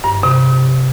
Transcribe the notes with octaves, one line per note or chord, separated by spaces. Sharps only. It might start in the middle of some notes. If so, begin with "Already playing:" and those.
G2
C3